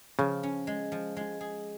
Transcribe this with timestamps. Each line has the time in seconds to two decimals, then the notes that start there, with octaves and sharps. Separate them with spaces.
0.19 C#3 F3
0.43 C#4
0.67 G#3
0.92 F3
1.17 G#3
1.41 G#4